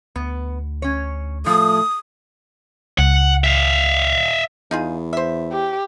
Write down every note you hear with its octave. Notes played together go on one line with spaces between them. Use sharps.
D2 B3
C#4 C#5
A2 F3 A3 D#6
C#2 F#5
E5 F5
E2 D#4 F4 G#4
C5 E5
G4